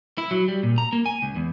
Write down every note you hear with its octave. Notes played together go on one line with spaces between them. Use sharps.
E4
F#3
G3
A#2
A#5
A#3
G#5
C#2
E2